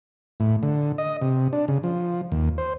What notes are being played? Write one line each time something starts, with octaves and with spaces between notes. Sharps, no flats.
A2
D3
D#5
C3
D4
C#3
F3
D#2
C5